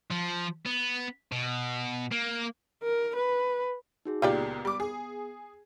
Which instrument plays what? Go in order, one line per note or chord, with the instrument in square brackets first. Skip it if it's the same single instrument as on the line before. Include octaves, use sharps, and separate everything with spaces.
[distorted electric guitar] F3
B3
B2
A#3
[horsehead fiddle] A#4
B4
[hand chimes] D#4 F#4 G#4
[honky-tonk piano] C#2 A#2 [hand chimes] B3 [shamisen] F4 G4 D5
[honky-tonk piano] G3 D6
G#4